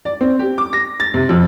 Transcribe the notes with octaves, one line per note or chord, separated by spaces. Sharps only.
D5
C4
G4
D6
A#6
A6
C3
F2